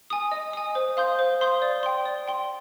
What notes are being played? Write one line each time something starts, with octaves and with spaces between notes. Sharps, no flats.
G#5 D#6
D#5
G#5 D#6
C5
F5 C6 D#6 G6
C5
F5 C6 D#6 G6
D5
G5 C6
D5
G5 C6